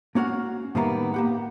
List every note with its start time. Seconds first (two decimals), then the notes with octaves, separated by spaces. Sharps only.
0.15 A#3 C#4 F#4 F5 F#5
0.75 A2 D#3 G3 A#3 B3 A#5
1.14 A#3 G4 F#5